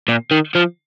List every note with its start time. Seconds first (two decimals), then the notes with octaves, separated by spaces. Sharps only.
0.08 A#2
0.31 D#3
0.55 F3